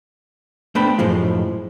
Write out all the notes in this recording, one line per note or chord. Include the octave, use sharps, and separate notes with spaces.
A3 B3 D4 C5 G5 B5
F#2 A2 F3 G#3